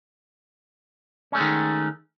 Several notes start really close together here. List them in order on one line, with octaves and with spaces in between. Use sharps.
C#4 A3 G#3 D#3